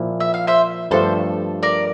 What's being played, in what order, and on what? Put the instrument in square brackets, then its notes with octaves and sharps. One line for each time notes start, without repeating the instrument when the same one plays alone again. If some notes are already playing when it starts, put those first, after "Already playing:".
Already playing: [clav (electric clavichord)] A#2 F3 E4
[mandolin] E5
F5
C5 E5
[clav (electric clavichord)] G2 F3 A3 D4 [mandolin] A4 C5
[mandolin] A#4 D5